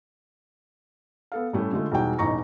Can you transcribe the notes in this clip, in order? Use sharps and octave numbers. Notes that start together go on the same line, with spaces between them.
B3 A4 F5
A2 G3 A3 C#4
D3 G#3 A3 F4
E1 G3 D#4 F#4 G5
E1 A1 D#4 A#5 C#6 A#6